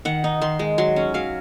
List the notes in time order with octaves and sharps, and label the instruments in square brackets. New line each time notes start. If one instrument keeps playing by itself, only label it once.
[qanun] D#3 F#5
D#4
D#3 C6
G#3
F#3 C6
C#4
F#3 F5